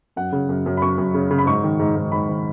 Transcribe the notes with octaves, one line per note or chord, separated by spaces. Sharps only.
F#2 F#5
C#3
F#2
F#2
B5
F#2 C#6
F#2
C#3
C#3
B5
G#2 C#6
D#3
G#2
G#2
G#2 B5
D#3